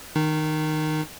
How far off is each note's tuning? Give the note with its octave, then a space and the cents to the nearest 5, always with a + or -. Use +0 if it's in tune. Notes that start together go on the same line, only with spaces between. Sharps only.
D#3 +0 D#4 -20